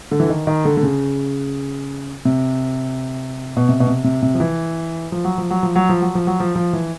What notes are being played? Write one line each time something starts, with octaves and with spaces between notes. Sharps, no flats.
D3
E3
D#3
D#3
D3
D3
C#3
C3
B2
C3
B2
C3
C3
C3
F3
E3
F3
F#3
F3
F#3
F3
F#3
F3
F#3
F3
F#3
F3
F3
E3